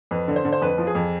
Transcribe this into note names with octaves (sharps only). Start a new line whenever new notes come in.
F2 B4
D3
C5
D3
C5
F2 B4
F3
G#4
F2